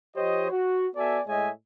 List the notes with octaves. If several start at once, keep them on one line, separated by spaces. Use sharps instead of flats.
F3 G4 C5 C#5 D#5
F#4
B3 F#4 A4 D5 E5 G#5
A2 G#3 C#5 D#5 E5 G#5